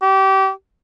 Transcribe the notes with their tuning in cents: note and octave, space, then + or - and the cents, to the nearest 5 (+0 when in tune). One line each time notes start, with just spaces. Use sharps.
G4 -25